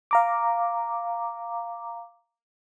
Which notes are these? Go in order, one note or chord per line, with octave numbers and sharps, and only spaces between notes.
F5 A#5 D6